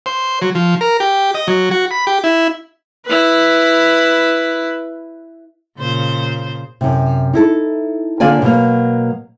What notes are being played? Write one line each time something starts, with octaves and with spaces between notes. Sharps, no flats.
C5
F#3
F3
A#4
G4
D#5
F#3
F#4
B5
G4
E4
E4 B4
A#2 C#3 C5
F#2 C3
D#4 E4 A4
D3 A#3 D4 F4 D5 G#5
B2 F#3 A#3